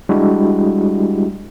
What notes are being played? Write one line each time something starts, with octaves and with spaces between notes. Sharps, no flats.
G3 G#3 D4 E4 F#4 G4